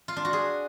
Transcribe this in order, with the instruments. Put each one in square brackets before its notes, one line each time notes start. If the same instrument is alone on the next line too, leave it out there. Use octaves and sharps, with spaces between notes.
[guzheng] F4
D4
F#4
G#4